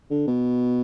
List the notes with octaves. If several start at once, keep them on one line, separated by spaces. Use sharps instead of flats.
D3
B2